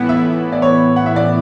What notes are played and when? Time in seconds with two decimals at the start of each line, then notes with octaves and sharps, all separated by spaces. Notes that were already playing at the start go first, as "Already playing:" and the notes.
Already playing: A2 E3 B3 E4 F#5
0.09 E5
0.52 D5
0.62 C#5
0.96 F#5
1.06 E5
1.16 D5